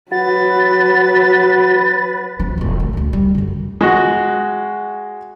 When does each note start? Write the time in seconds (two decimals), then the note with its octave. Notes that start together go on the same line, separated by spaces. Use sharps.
0.12 F#3 F#4 B4 A6
2.40 G1 F3
2.58 E1 A#1
2.80 D2
2.93 D2 A2
3.13 G3
3.35 F#2 D3
3.81 G#3 F#4